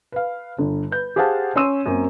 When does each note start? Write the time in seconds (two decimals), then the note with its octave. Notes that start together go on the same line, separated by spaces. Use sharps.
0.12 B4 F5
0.58 G1 D3
0.91 B4 G6
1.16 G4 G#4 C5 F5 F#5 A5
1.55 C#4 C#5 C6 E6 D#7 E7
1.86 F#2 A#3 C4